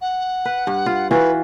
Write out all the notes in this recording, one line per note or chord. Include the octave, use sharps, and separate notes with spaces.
F#5
B4
G2
F4
E3 F4 F#4 B4